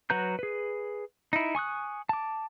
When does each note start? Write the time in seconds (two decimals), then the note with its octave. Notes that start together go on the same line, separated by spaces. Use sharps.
0.10 F#3 F#4 B4 A#5 G6
0.39 G#4 B4
1.33 D#4 E4
1.55 G#5 C#6 D#6 F#6
2.09 A5 D6